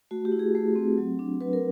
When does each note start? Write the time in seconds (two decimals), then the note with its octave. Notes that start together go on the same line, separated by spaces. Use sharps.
0.11 A3 F#4
0.25 G4
0.32 E4
0.39 G#4
0.55 A3
0.75 C4
0.98 F#3
1.19 D4
1.41 F#3 B4
1.53 A#4